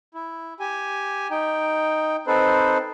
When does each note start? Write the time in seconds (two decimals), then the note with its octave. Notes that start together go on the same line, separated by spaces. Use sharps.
0.14 E4
0.60 G4 G#5
1.31 D#4 G5
2.27 C4 D#4 A4 B4 C5